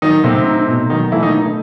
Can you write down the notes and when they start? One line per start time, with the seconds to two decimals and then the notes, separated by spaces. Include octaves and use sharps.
0.02 D#3 F#3 D#4
0.24 C3 A3 C4
0.46 D#4
0.68 B2
0.90 D#3 F#3 D#4
1.12 E3 A3 E4
1.23 D#3 D#4
1.34 D#4